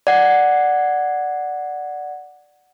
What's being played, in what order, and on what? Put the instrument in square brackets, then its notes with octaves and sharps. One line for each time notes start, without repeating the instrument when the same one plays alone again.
[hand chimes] D5 F#5